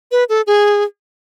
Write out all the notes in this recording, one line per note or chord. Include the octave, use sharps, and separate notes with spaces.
B4
A4
G#4